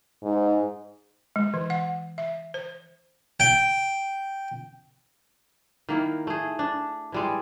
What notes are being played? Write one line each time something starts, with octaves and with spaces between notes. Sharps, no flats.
G#2
G#3
E3
F#5
E5
C5
G5
D#3 A#3 E4
A3 G#4
D4
E3 G3 G#3